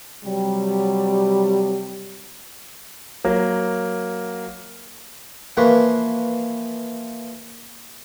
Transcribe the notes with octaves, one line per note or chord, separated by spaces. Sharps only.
C3 F#3 G3
F#3 A#3
E3 F3 A#3 F#4 B4